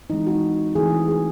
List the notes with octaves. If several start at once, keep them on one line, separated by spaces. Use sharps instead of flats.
E3 G#3 C4 D#4
F#4
E3 A3 C4 G#4
G#4